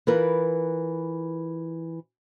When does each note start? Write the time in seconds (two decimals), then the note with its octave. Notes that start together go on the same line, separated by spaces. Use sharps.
0.07 E3 F4 A#4 B4